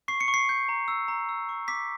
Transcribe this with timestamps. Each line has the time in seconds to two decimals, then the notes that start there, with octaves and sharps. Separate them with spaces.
0.08 C#6 C7
0.21 C#7
0.28 C#6
0.34 C7
0.49 G6
0.69 A#5
0.88 E6
1.08 A#5
1.29 E6
1.49 C#6
1.68 D6 B6